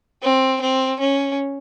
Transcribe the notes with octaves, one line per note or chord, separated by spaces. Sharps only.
C4
C4
C#4